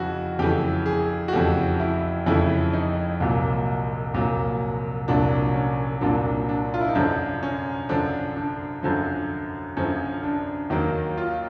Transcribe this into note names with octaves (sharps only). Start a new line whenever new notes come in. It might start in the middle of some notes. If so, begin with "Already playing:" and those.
Already playing: F2 C#3 E3 F#4
F2 C#3 E3 A3 G4
G#4
F#4
F2 C#3 E3 A3 G4
E4
F2 C#3 E3 A3 E4
D#4
C2 A#2 F#3
C2 A#2 F#3
C2 A#2 F#3 D4
C#4
C2 A#2 F#3 D4
D4
F4
E4
D#4
F#2 D3 F3 D4
C#4
F#2 D3 F3 D4
D4
F#2 D3 F3
F#2 D3 F3 C#4
D4
D#2 D#3 F#3 A#3
F4